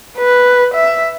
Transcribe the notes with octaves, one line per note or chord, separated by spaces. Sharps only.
B4
E5